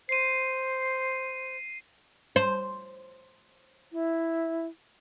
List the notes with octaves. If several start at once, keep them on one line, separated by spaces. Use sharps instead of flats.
C5 C7 D#7
C5
E4